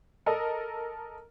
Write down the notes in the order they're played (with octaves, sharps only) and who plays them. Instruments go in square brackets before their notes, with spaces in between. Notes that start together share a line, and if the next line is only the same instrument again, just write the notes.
[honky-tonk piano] A4 A#4 D#5